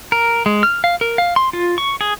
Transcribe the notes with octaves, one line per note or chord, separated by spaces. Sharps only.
A#4
G#3
F6
F5
A#4
F5
C6
F4
C#6
G#4